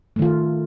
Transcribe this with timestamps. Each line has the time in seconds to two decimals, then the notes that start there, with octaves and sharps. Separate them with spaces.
0.16 A3
0.19 D#3
0.22 F4